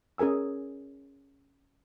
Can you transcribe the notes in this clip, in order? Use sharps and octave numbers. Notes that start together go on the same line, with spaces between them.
C#4 G#4 A#4 G#5 E6